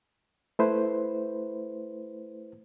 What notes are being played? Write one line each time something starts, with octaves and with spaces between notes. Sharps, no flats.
A3 E4 B4 C5